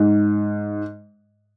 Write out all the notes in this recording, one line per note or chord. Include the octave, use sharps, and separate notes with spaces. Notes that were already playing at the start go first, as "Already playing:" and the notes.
Already playing: G#2